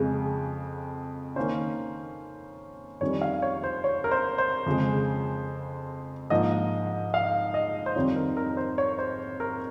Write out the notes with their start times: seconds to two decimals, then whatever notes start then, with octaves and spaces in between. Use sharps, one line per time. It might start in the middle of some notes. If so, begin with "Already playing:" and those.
Already playing: F2 C#3 G#3
1.36 D#3 A#3 C#4 C5
3.01 F2 D#3 G3 C#4 C#5
3.22 F5
3.42 C#5
3.64 C5
3.84 C#5
4.04 A#4
4.11 C5
4.38 C5
4.66 F2 C#3 G#3
6.30 G#2 F3 A#3 D#5
7.14 F5
7.54 D#5
7.86 C5
7.96 F2 D#3 G3 C4 D#4 C#5
8.16 A#4
8.37 A#4
8.57 C5
8.78 C#5
8.99 C5
9.40 A#4